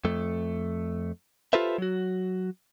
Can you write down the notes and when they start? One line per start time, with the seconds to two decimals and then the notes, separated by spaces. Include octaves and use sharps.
0.05 F2 A3
1.53 F4 G4 A4 B4 C5 E5
1.78 F#3 F#4